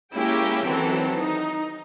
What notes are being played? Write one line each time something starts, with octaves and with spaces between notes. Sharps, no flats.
G#3 A#3 C#4 E4 G4 G5
D#3 E3 F#3 C4 A4
D#4